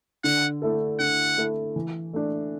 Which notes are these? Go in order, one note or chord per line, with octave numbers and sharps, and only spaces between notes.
D3 F#5
A3 E4 A4
D3 F#5
A3 E4 A4
E3
A3 D4